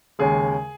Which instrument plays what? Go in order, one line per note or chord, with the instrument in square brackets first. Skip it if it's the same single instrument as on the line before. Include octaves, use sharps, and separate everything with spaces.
[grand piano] D#2 C#3 G#3 G#4